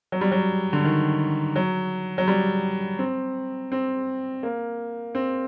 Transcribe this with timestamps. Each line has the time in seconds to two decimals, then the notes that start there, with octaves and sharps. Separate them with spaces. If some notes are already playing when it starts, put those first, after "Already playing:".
0.12 F#3
0.21 G3
0.32 F#3
0.73 D3
0.85 D#3
1.56 F#3
2.18 F#3
2.28 G3
2.99 C4
3.72 C4
4.43 A#3
5.15 C4